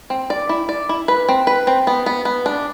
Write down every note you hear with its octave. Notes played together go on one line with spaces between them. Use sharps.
C4
D5
E4
D5
E4
B4
C4
B4
C4
B3
B3
B3
D4